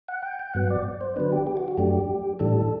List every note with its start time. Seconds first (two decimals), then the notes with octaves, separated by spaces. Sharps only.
0.08 F#5
0.23 G5
0.39 G5
0.54 G2 F#3 B3 F#5
0.70 D5
1.01 C5
1.16 D3 F#3 B3 D4 B4
1.32 G4
1.47 G4
1.57 F#4
1.68 F#4
1.78 F#2 F#3 A3 D4 G4
2.39 A2 E3 G3 D4 A4